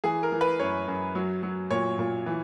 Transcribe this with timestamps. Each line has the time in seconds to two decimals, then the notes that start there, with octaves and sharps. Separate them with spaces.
0.04 E3 G#4
0.23 A#4
0.32 E3
0.41 B4
0.60 F#2 C#5
0.88 F#2
1.15 F#3
1.43 F#3
1.71 A#2 C#5
1.99 A#2
2.26 E3